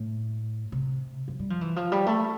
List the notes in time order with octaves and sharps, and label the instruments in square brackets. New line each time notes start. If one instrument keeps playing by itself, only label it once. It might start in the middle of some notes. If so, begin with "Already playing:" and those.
Already playing: [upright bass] A2
C3
F3
G3
F3
E3
F3
G3
A3